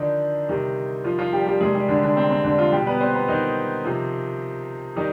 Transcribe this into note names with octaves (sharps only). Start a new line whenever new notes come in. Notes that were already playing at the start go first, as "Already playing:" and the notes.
Already playing: D3 D#3 F3 D4 D#4
C3 D#3 G3
F3 F4
F3 F4
G3 G4
G3 G4
C3 D#3 G3 G#3 G#4
G3 G4
D3 D4
D3 D4
C4
C4
D3 D4
F3 F4
B2 G3 G4
B3 B4
C4 C5
B3 B4
D#3 D#4
C3 F3
D#3 G3 D#4